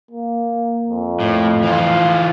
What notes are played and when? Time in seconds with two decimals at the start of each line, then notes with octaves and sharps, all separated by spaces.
0.11 A#3
0.89 F2
1.20 A2
1.63 E3 F4